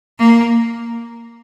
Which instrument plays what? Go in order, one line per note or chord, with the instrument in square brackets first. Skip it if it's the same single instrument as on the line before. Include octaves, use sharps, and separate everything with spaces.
[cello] A#3